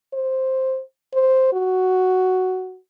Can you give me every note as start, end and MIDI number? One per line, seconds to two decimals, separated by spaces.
0.13 0.82 72
1.13 1.49 72
1.53 2.78 66